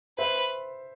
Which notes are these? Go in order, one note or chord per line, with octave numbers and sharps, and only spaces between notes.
B4 C5 E5